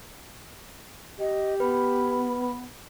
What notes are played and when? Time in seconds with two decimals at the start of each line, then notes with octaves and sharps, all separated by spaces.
1.20 G4 D#5
1.60 B3 B4 B5